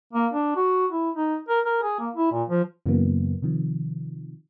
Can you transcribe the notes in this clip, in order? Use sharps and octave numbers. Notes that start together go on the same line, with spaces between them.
A#3
D4
F#4
E4
D#4
A#4
A#4
G#4
A#3
E4
A#2
F3
F#2 C#3 E3 F#3 A#3 B3
C3 D#3 F3